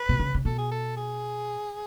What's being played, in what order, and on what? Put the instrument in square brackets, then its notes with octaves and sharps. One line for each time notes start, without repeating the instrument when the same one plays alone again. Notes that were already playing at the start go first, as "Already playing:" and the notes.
Already playing: [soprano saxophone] B4
[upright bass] B2
C#3
C#3
[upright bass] B2 [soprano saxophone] A4
[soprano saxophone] G#4
A4
G#4